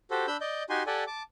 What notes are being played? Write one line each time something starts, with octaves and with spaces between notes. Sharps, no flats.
F#4 G4 A4 C5
D4 B5 E6 G6
D5 D#5 G6
D#4 F#4 G4 G#5 C6
G4 A4 D5 F#5 G#5
A5 D6